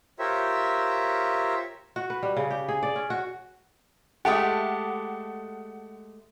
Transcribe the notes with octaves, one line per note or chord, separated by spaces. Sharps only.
F4 G4 A#4 C5 C#5 E5
F#4
B4
G3
C#3
G4
G#4
D5
C#4
F#4
G#3 A3 G4 F#5 A5